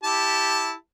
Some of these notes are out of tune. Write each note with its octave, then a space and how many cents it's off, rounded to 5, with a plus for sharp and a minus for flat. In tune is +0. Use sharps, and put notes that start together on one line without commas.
E4 -10 G4 +0 A5 +0